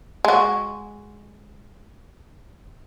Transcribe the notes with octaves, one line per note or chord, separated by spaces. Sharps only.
G#3 F#4